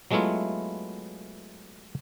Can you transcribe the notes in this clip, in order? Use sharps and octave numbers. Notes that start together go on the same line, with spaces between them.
F#3 G#3 A3 B3 E4 F4